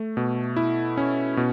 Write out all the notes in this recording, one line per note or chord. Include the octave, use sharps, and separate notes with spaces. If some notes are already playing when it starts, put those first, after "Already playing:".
Already playing: A3
B2
E4
C#4
B2